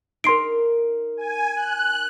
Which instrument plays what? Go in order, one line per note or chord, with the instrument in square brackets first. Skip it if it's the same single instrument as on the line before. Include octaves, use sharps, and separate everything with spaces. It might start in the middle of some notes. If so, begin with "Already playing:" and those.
[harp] D#4 A#4 [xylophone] C6 C7 D7
[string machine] G#5
F#6